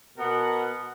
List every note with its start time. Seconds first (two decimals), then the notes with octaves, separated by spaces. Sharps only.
0.17 B2 B3 A#4 F#5